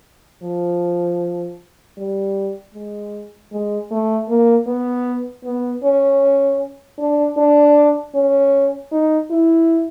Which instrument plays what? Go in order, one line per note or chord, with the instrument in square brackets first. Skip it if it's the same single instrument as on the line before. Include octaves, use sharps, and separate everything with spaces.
[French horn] F3
G3
G#3
G#3
A3
A#3
B3
B3
C#4
D4
D4
C#4
D#4
E4